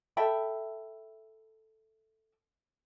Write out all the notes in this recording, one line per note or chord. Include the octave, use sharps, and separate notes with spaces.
A4 E5 G5 B5